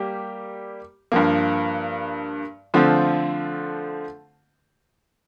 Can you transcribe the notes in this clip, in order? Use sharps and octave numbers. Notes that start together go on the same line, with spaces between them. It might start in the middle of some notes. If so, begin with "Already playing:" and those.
Already playing: G3 A#3 G4
G2 F3 A#3
D3 F3 A3 C4 F4